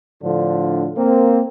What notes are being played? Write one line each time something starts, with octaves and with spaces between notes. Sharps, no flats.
A2 D3 F3 D4
A#3 C4